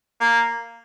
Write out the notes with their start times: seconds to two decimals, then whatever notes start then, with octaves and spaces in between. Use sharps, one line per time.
0.21 A#3